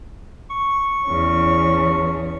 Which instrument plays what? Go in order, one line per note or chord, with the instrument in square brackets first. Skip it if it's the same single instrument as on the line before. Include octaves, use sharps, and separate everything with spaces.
[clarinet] C#6
[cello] E2 C#4